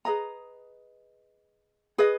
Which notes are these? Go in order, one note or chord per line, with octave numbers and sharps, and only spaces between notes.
G#4 B4 D#5 A#5
G#4 B4 D#5